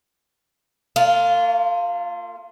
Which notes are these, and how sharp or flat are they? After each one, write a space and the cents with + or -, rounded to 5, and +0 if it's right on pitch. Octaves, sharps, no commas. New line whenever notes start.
A#3 -45 F4 +0